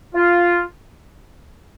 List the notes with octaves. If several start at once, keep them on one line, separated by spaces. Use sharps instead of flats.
F4